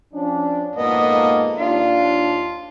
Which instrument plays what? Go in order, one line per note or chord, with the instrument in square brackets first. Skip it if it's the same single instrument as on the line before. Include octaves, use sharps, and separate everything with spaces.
[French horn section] F3 C#4 D4
[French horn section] F2 G#2 A#3 [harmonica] B3 D#5
[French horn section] D#2 D4 [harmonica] F4 F5